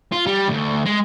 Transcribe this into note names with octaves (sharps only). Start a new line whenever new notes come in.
F4
G3
D2
G#3